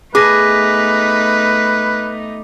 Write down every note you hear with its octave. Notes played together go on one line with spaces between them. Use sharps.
A3 B3 D#4 G#4 B4 D6 A#6